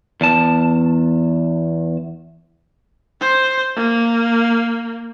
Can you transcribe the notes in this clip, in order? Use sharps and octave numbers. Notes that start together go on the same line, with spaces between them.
E2 A5
C5
A#3